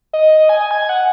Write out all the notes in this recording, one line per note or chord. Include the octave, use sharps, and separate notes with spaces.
D#5
G#5
G#6
F#5